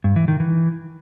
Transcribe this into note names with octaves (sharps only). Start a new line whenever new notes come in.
G2
E3
D#3
E3